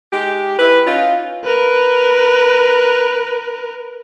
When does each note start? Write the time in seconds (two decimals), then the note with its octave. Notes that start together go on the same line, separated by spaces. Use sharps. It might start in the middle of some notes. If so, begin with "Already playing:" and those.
0.12 G#3 D#4 G4
0.59 E4 B4
0.86 C#4 D#4 F4
1.44 A#4 B4